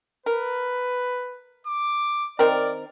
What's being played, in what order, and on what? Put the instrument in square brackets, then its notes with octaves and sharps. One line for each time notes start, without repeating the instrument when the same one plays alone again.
[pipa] A#4 [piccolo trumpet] B4
[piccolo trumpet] D6
[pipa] D#3 C4 A#4 [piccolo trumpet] D5